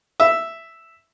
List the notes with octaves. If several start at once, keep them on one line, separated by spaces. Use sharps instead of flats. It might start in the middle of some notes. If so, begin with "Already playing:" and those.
E5